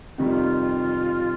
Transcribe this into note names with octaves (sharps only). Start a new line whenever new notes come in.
F2 C3 D#3 G3 F4